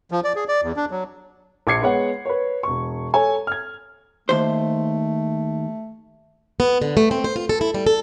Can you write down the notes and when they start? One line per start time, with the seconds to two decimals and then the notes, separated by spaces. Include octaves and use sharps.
0.11 F3
0.24 D5
0.35 G#4
0.48 D5
0.63 E2
0.77 D4
0.91 F#3
1.67 A#1 D6 G#6 C7 C#7
1.81 G#3 B3 C#5 F#5
2.25 B4 C#5
2.63 E1 C#6
3.14 A4 C#5 G#5
3.47 F6 G#6
4.29 D#2 A3 C5
6.60 B3
6.82 D3
6.97 A3
7.11 C4
7.24 C5
7.36 F4
7.49 A4
7.61 E4
7.74 G3
7.87 A4